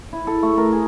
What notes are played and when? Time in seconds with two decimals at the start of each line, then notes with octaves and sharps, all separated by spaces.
0.13 E4
0.27 A4
0.43 A3
0.57 A#4
0.72 G#4